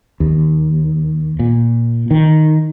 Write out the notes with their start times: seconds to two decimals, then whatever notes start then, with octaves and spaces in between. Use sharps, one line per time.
0.20 D#2
1.39 A#2
2.11 D#3